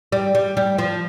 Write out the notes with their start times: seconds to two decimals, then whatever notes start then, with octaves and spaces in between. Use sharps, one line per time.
0.12 G3
0.35 G3
0.57 G3
0.78 F3